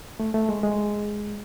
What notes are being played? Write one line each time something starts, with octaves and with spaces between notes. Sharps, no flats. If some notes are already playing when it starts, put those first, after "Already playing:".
A3
A3
G#3
G#3